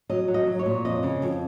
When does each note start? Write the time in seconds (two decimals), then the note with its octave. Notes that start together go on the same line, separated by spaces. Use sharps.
0.09 F#3 D#5
0.28 F#3
0.34 D#5
0.47 F#3
0.59 C#5
0.66 A#2
0.85 F2 D#5
1.03 C#3
1.22 F2